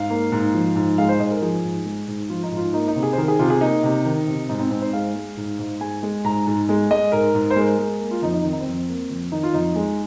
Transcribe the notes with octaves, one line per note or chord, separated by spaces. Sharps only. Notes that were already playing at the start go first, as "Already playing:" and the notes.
Already playing: G#2 F5
A#3
G#2
F3
G#2
G#3 F5
C5
G#2 D#5
A#4
F3 G#4
G#2
G#3
G#2
F3 F4
D#4
G#2
F4
A#3 D#4
D#4
C3
G#4
C5
D#3 A#4
G#4
C3 F4
G#4
A#3 D#4
C3
D#3
C3
G#2 D#4
C4
G#2 C4
C5
G#3 F5
G#3
G#2
G#2
G#3 G#5
G#3
G#2 A#5
G#2
G#3
G#3 D#5
G#2 A#4
G#2
C5
G#3 A#4
G#3
A#3
F4
F2 D#4
D#4
D#3 C4
D#4
C4
F2
A#3
F2
D#3 D#4
F4
F2 D#4
G#3